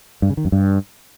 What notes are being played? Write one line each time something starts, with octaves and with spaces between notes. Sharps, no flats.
G2
C#3
D#3
F#2
G2